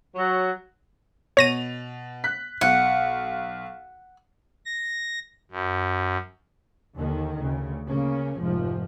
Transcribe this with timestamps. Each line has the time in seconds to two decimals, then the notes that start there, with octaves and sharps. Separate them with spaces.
0.15 F#3
1.37 B2 C#5 A#6 D#7 F7
2.24 F#6 B6
2.61 B1 F#5
4.66 A#6
5.51 F#2
6.97 D#2 D3 D#3
7.40 D2 C#3
7.87 C#3 A#3 C#4
8.38 F1 G#2 F3